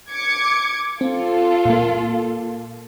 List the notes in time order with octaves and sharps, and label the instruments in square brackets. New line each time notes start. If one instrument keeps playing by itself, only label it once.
[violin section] D6 G#6 C#7
[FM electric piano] C4 [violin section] F4 A4
[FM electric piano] A#2 A#3